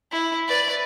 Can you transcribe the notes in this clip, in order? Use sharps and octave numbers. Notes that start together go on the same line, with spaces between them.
E4
B4 D5